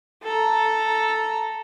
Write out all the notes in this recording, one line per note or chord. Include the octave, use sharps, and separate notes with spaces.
A4 A#5